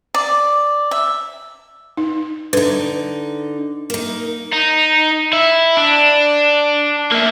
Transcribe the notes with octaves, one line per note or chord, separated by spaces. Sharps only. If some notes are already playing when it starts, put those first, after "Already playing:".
D5
E5
D#4
D3 D#4 B4
A#3 D#4
D#4
E4
D4
A#3 E5